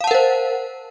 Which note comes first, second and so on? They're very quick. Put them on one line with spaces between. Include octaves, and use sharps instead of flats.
F5 A5 F#5 A#4 C5